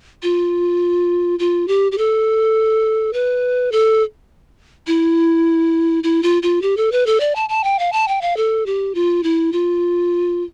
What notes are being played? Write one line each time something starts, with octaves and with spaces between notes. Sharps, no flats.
F4
F4
G4
G4
A4
B4
A4
E4
E4
F4
F4
G4
A4
B4
A4
D5
A5
A5
G5
F5
A5
G5
F5
A4
G4
F4
E4
F4